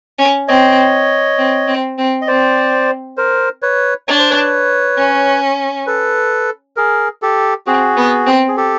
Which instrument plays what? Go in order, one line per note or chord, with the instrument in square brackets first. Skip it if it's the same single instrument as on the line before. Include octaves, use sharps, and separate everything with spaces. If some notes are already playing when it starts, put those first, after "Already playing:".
[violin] C#4
[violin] C4 [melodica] C#5 D#5
[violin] C4
C4
C4
[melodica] D#5
[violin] C4 [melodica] C5 D5
[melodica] A#4 C5
B4 C#5
[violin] D4 [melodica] C#5
[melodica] C5
B4 C#5
[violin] C#4
[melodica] A4 B4
G#4 A#4
G4 A4
[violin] C4 [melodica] F#4 G#4
[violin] B3
C4
[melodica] G#4
G4 A4